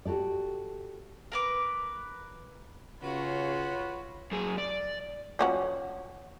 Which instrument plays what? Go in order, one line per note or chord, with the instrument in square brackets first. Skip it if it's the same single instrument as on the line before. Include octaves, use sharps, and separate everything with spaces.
[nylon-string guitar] F#4 G4 A4 D5
[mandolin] A#4 B4 D6
[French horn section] C#3 [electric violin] F4 [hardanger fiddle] F#4 [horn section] B4 C#5
[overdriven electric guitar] F#2 G#4
D5
[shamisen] F3 C#4 F#4